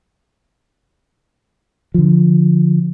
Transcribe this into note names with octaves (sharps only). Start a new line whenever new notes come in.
D3 F3